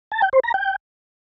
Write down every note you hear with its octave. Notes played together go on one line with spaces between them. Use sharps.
A5
G5
C5
A#5
G5